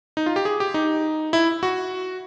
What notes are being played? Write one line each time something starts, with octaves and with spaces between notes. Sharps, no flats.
D#4
F4
G4
G#4
G4
D#4
E4
F#4